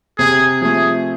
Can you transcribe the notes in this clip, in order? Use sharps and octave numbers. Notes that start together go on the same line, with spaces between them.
C3 G#4
F3 A3 G#4